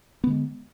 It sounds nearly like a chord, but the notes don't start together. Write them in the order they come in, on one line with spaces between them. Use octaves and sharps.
B3 D3 G#3